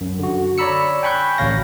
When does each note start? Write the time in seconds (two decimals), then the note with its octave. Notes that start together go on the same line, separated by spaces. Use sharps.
0.01 F#2
0.19 D3 F#4
0.58 C#5 D5 A#5 B5 E6 C#7
1.03 G5 G#5 B5 C#6 F#6 G6
1.38 A1 D2 C#5 F5 A#6